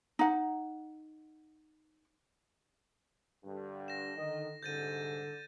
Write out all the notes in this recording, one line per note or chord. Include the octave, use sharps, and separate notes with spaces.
D#4 F#5
G2 D3
A#6 E7
D3 D#3 D#5
C2 G#2 D3 G6 A6 D#7